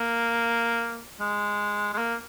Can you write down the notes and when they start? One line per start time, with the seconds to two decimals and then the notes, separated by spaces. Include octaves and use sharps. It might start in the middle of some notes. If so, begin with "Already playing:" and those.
Already playing: A#3
1.20 G#3
1.93 G#3
1.98 A#3